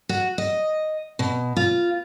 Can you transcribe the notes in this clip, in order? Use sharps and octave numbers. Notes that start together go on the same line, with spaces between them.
F#4
D#5
B2
F4